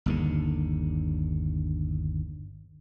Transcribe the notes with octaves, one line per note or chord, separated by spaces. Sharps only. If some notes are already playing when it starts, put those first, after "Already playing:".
G1 D#2 D3